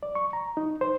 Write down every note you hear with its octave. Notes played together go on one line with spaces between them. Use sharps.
D5
C#6
A#5
D#4
C5